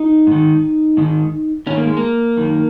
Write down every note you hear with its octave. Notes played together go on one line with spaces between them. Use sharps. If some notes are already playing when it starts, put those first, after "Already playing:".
Already playing: D#4
G#2 D#3
G#2 D#3
G#2 D#3 C#4
A#3
G#3
A#3
F#2 D#3